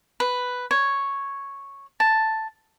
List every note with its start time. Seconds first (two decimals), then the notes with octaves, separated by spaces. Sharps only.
0.20 B4
0.71 C#5
2.00 A5